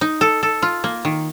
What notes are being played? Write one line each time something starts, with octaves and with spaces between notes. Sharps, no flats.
D#4
A4
A4
F4
A#3
D#3